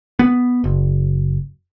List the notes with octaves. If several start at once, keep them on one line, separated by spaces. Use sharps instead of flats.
B3
F#1